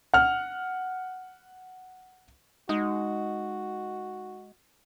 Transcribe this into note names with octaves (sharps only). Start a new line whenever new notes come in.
F#5 F6
G#3 D#4 F#4